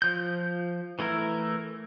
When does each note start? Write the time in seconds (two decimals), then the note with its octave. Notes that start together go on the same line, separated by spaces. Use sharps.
0.02 F3 G6
0.99 E3 A3 E4 A#4